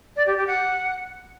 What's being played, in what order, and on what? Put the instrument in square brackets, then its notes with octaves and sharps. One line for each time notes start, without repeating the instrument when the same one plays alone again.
[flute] D5
G4
G4
F#5